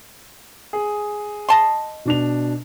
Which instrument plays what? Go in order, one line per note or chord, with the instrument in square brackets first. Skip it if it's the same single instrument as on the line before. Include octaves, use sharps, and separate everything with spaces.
[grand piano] G#4
[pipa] D#5 A5 C6
[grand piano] B2 D4 F7